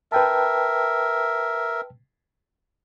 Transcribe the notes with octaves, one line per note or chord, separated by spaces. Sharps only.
A#4 B4 E5 G5 A5